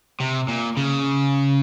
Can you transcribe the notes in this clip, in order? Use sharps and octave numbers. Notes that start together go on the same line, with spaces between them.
C3
A#2
C#3